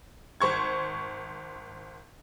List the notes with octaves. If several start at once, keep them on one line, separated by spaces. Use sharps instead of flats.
G#1 C5 C#6 G#6